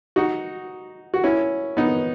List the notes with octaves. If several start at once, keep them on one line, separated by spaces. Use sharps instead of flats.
D#4 F#4
F#4
C#4 E4
B3 D#4